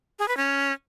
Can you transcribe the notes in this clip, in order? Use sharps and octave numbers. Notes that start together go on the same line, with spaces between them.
G#4
B4
C#4